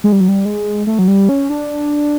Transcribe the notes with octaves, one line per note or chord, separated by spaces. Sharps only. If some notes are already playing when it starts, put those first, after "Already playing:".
G#3
G3
F#3
G3
G#3
A3
F#3
G3
C#4
D4